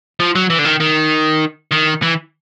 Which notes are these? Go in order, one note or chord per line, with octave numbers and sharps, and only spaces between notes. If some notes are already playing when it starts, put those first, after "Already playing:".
F3
F#3
E3
D3
D#3
D#3
D#3
E3